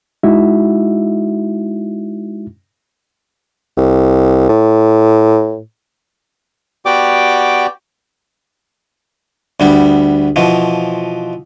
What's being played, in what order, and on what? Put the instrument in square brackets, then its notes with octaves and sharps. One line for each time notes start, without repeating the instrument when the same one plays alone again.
[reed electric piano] G#3 D#4 E4 F#4 E5
[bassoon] C2
A2
[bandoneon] B3 F#4 G4 D5 G5 D6
[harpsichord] D2 G3 B3
B2 E3 F3